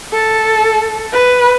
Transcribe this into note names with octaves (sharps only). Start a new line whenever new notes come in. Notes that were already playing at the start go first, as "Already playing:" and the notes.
A4
B4